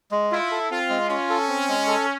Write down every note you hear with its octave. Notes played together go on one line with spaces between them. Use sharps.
G#3
E4 F4
A4
C4 F4
G#3
C#4 F4
A4
C4
G#3
A4